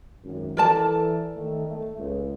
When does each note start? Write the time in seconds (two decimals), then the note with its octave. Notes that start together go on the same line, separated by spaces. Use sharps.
0.24 G#1 F#2
0.57 E3 A4 A#4 D5 A5
1.36 D#3 A3
1.65 A3
1.97 C#2